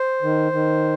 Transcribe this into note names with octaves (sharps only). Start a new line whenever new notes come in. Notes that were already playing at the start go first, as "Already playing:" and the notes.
Already playing: C5
D#3
D#3